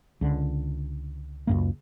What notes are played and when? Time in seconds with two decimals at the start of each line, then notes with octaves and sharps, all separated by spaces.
0.21 C#2 D3
1.47 C#2 F#2 A#3